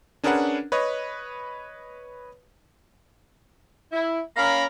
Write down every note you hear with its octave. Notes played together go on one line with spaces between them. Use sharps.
C#4 D4 G#4 A#4 B4 F#5
B4 C#5 D#5
E4
A#3 C#4 A#4 F5 A#5 B5